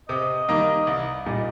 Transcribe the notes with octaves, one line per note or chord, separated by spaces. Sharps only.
C3 D#5
D#3 G3 A#3 D#4
C2
A#2 G3 D#4